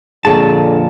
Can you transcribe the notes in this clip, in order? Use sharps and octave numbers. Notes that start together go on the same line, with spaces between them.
F2 A#2 D3 G#4 A4 C#5 A5